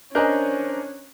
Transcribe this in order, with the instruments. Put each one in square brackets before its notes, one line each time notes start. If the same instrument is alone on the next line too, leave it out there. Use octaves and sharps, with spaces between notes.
[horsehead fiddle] C#4 [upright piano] D4 D#5 G#5 [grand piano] A#4 [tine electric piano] C5 F#6 G6